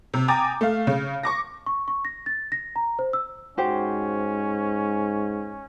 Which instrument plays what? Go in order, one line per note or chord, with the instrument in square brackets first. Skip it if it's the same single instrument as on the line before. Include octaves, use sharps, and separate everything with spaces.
[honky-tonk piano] C3
G5 G#5 A#5 D6 D#6 A6
A3 F5
C#3
C#6 D6 A#6
[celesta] C#6
C#6
A#6
A6
A#6
A#5
C5
E6
[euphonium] G#2 [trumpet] C#4 [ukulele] F#4 G4 C5